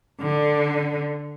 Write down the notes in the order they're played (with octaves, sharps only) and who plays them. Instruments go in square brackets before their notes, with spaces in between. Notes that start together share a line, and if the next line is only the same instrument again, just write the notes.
[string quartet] D3